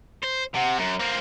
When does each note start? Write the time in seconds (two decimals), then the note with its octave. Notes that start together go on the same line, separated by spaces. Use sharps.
0.23 C5
0.54 C3 F#5
0.79 F#2 A#5
1.00 A#3 C4